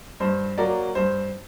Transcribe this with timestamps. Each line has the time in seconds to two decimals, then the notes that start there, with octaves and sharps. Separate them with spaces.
0.20 G2 C5
0.58 F#3 A#3 D5
0.95 G2 C5